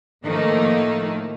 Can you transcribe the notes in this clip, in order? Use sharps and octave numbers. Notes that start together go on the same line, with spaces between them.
A2 D#3 F3 A3 A#3 D#4